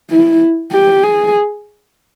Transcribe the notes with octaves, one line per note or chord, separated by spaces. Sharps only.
E4
G4
G#4